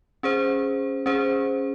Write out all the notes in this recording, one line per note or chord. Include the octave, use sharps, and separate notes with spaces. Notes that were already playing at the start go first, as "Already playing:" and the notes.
C#4 G#4 C5
C#4 G#4 C5